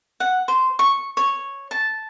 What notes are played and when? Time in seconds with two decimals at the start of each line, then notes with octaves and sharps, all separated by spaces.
0.20 F#5
0.48 C5
0.79 C#6
1.17 C#5
1.71 A5